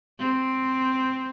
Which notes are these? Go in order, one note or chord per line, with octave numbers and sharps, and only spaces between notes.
C4